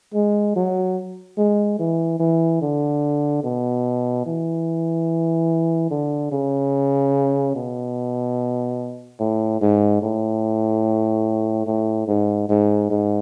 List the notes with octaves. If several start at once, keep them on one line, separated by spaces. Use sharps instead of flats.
G#3
F#3
G#3
E3
E3
D3
B2
E3
D3
C#3
B2
A2
G#2
A2
A2
G#2
G#2
G#2